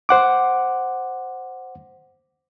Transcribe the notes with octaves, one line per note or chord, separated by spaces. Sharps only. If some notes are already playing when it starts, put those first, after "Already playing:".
C5 F#5 D6